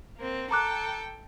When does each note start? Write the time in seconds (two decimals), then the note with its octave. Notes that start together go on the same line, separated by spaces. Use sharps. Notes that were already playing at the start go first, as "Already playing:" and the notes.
0.17 A#3 C4
0.51 A4 G5 A#5 D6 F#6